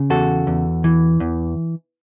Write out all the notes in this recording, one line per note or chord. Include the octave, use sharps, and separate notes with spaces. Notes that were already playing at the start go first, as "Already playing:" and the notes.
Already playing: C#3
E2 F#4 A4
E2
E3
E2